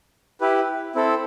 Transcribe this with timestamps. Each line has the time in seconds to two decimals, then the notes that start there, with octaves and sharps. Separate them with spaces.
0.41 E4 G4 B4
0.95 C4 E4 A4